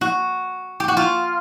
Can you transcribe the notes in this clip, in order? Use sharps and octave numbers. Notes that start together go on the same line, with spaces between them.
F#4
G4
F#4
F4